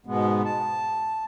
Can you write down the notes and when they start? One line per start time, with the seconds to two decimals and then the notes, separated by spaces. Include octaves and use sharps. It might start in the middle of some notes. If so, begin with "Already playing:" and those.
0.06 G#2 B2 G#3 B3
0.45 A5